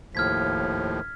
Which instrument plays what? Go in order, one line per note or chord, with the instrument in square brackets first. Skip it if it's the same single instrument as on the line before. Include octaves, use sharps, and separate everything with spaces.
[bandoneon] D#2 A2 F3 [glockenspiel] F6 G#6 B6